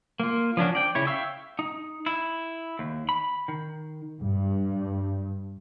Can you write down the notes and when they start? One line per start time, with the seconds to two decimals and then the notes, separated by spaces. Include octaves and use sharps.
0.20 A#3 F4
0.57 F3 C#4 D4 F#4
0.75 D5 G5
0.95 C#3 E4 C#5
1.07 E5 F5 G5 C#6 E6
1.59 D#4
2.06 E4
2.79 D#2
3.09 B5
3.48 D#3
4.21 G2